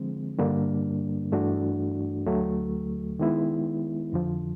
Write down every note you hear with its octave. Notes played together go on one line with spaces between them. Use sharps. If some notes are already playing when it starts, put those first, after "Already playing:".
Already playing: D3 F3 G#3 C4
G2 D3 G3 A#3 D4
G2 E3 A3 D4 F#4
D2 D3 F#3 A3
D#3 G#3 B3 E4
F2 D3 F3